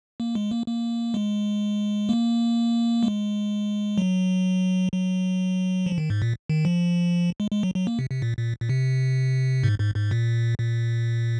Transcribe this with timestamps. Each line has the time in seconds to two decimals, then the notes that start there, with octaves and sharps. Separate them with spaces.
0.20 A#3
0.35 G#3
0.51 A#3
0.67 A#3
1.14 G#3
2.09 A#3
3.03 G#3
3.98 F#3
4.92 F#3
5.86 F3
5.98 D#3
6.10 G#2
6.22 A#2
6.49 D#3
6.65 F3
7.40 G#3
7.51 G#3
7.63 F#3
7.75 F#3
7.87 A#3
7.99 C3
8.10 C3
8.22 A#2
8.38 A#2
8.61 A#2
8.69 C3
9.63 G#2
9.80 G#2
9.95 G#2
10.11 A#2
10.58 A#2